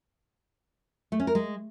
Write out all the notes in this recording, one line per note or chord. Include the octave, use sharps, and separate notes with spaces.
A3
C#4
A#4
G#3